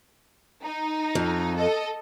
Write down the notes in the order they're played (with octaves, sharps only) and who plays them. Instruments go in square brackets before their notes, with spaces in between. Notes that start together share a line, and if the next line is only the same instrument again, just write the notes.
[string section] D#4
[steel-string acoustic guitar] F2
[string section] A4 D#5